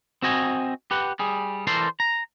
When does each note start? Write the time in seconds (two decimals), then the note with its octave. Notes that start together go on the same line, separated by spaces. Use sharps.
0.22 C4 F#4 D#5 G#5
0.91 G4 B4 F#5
1.19 G3 G#4
1.67 E3 A4 A#4 C5 D5 C6
2.00 A#5